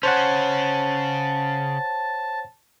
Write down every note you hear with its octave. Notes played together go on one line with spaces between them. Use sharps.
C#3 C#4 C5 C#5 F#5 A5